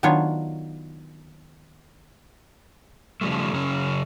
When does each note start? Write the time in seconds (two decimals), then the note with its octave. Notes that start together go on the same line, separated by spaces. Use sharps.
0.03 D#3 F#3 B3 D4 F4 C#5
3.21 C#3 F3 G3 A3
3.54 C#3 F#3 C#4